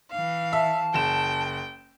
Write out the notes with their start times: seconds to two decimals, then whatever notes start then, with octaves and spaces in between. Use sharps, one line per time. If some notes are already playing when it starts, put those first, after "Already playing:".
0.11 E3 F5
0.53 E5 A5
0.94 F#1 G5 E7